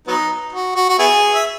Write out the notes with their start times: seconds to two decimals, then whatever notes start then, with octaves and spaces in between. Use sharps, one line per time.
0.07 F#3 B3 D#4
0.53 F#4
0.76 F#4
0.89 F#4
0.99 B3 E4 G#4
1.35 E5